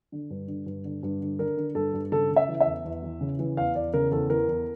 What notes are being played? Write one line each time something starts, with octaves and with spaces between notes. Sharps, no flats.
D3
G2
D3
G2
D3
G2
D3
D3 A#4
D3
G2 A4
G2
C#3 A4
C#3
E5
E3
E5
E2
E2
E3
C#3
E3
E2 F5
E2 D5
C#3 A#4
E2 A4
E3 A#4
E2